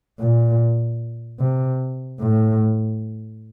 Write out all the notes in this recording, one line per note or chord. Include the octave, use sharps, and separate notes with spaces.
A#2
C3
A2